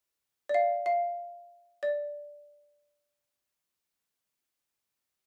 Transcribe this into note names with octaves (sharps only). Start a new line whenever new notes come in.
D5
F5
F5
D5